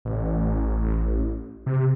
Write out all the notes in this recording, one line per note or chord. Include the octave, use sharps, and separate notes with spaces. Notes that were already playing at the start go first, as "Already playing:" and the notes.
A1
C3